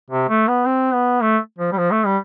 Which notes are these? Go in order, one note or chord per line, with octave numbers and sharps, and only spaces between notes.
C3
A3
B3
C4
B3
A3
F3
G3
F3
A3
G3